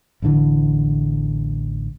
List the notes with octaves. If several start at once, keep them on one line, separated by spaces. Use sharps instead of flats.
A1 E2 D3 E3